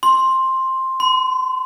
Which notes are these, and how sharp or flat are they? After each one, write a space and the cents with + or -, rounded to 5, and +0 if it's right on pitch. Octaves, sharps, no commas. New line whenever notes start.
C6 +10
C6 -40